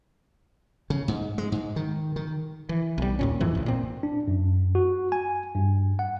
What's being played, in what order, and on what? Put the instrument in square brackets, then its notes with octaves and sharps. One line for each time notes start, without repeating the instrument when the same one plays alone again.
[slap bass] C#3
G#2
G#3
G#2
D#3
D#3
[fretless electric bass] E3
B1 G3
D#2 A#2 C#4
F2 G#2 E3
A1 D2
A#2 C4
[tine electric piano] D4
F#2
F#4
G#5
G2
F#5